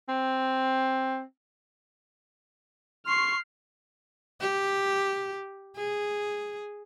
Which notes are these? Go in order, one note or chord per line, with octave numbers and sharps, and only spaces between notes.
C4
C6 C#6 F6 C7
G4
G#4